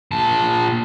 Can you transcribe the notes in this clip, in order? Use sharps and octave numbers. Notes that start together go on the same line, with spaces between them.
A#2 A5